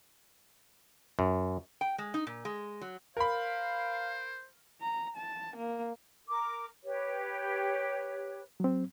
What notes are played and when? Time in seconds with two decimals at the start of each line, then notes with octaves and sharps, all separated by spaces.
1.19 F#2
1.81 G5
1.98 G#3
2.14 D#4
2.27 A#2
2.45 G#3
2.81 F#3
3.17 A#4 C5 F5 B5
4.82 A#5
5.17 A5
5.57 A#3
6.28 A#4 D6
6.84 G4 B4 C#5
8.60 F#3 C4